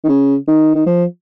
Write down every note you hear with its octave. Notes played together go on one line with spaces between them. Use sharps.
D#3
C#3
D#3
D#3
F3